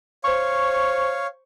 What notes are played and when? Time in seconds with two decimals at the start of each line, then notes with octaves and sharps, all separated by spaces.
0.24 C5 C#5 F5 C#6